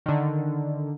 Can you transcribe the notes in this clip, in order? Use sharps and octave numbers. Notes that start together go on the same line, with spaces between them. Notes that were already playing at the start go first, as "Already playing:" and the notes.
D3 D#3